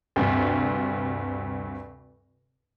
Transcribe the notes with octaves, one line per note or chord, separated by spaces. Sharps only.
D2 G2 C3